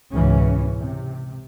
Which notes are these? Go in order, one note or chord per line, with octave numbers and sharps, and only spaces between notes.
C#2 G#2 B2 E3 C#4
C3